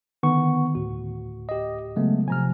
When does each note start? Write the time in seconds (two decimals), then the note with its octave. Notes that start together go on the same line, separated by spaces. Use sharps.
0.23 D3 D#3 B3 C#6
0.75 D2 A2 F#4
1.49 G4 D#5
1.96 C#3 F#3 G#3 A3 B3
2.28 C3 F3 G#5 A#5 F6